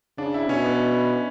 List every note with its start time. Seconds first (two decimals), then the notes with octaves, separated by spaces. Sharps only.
0.18 C#3 D4
0.34 E4
0.49 B2 C#4
0.64 B3